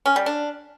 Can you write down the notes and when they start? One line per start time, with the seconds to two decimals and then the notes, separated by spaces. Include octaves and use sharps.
0.06 C#4
0.16 G3
0.26 D4